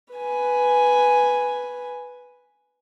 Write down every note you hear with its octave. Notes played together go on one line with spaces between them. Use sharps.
B4 G#5